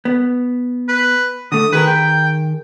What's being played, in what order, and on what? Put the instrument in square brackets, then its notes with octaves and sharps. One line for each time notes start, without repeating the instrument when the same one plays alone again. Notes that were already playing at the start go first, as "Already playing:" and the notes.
[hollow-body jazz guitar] B3
[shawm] B4
[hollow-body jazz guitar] D3 A3 [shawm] D#6
[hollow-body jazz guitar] D#3 G#4 A#4 [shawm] B4
[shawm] G5